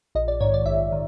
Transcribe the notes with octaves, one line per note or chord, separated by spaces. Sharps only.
A#1 D#5
D5
G#2 D#3 C#5
D5
A#1 E5
D#3